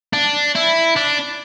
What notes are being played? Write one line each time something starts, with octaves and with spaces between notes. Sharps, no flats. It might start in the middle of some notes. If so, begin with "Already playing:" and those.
D4
E4
D4